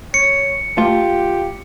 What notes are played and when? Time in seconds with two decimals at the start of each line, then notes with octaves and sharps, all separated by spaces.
0.14 C#5 C#7
0.78 A3 F4 G4